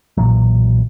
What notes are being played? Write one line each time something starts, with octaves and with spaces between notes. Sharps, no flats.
B1 A#2 E3 F#3